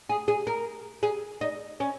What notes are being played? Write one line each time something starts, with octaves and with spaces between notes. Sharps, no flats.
G#4
G#4
A#4
G#4
D#4
C#4